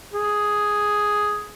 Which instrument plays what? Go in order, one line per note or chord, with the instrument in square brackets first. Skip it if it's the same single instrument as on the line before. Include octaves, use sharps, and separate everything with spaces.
[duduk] G#4